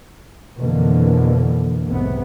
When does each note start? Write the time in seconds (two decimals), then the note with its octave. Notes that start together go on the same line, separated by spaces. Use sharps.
0.59 F2 B2 D3 E3 A#3
1.88 B1 G#2 C3 B3